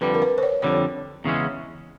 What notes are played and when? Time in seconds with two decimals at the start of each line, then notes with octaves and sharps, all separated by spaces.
0.01 F2 D3 G3 B4
0.14 A#4
0.22 B4
0.38 C5
0.43 C#5
0.62 F2 D3 G3 C#5
1.25 E2 C#3 E3 G#3 C#4